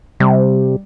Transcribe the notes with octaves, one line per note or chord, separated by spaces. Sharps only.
C3 G3